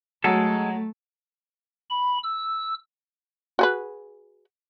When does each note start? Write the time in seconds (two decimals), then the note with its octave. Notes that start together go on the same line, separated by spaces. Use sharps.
0.24 F#3 G#3 A3 A4
1.90 B5
2.23 E6
3.59 F#4 G#4 B4